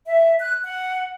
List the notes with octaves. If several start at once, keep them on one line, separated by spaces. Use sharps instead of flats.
E5
F#6
F#5